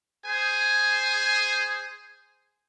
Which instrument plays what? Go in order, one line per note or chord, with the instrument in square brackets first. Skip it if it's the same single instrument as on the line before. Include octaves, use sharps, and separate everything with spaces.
[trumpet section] G#4 C5 G#5